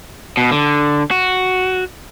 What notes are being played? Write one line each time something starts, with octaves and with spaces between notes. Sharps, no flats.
B2
D3
F#4